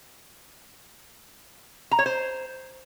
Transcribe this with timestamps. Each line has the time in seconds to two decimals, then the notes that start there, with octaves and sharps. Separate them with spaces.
1.91 A#5
1.99 C#5
2.06 C5